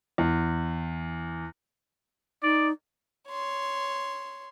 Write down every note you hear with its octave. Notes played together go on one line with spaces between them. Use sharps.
E2
D#4 D5
C#5 C6